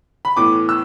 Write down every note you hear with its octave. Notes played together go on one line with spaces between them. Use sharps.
B5
A2 E3 B3 D6
E6